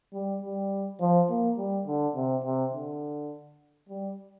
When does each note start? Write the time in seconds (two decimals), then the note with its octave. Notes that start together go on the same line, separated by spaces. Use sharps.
0.13 G3
0.42 G3
1.00 F3
1.30 A#3
1.58 G3
1.87 D3
2.16 C3
2.44 C3
2.74 D3
3.89 G3